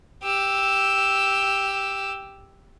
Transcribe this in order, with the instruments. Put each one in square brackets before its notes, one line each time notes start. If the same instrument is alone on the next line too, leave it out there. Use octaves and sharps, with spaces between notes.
[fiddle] G4 E6